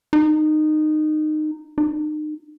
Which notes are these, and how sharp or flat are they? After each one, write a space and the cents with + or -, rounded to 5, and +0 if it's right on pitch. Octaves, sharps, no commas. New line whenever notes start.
D#4 -20
D#4 -35